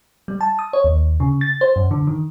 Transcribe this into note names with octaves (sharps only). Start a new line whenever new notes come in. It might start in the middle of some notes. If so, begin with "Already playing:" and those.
G3
A5
D#6
C#5
D#2
C#3
A6
C5
F#2
D3
D#3